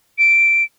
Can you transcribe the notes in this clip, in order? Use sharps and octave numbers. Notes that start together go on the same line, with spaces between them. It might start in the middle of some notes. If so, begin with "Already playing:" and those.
D7